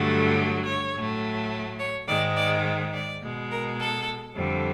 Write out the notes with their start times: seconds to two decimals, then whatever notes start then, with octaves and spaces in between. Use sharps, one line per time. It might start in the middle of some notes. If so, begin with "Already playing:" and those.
Already playing: G2 D3 F#3 A3
0.66 C#5
0.93 A2 F#3 A3
1.79 C#5
2.07 G#2 D#3 G#3 D5
2.35 D5
2.93 D5
3.22 B2 G#3
3.50 A#4
3.79 A4
4.35 F2 D3 G3